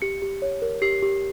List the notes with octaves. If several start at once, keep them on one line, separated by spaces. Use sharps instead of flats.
G4 C#7
G4
C#5
A#4
G4 C7
G4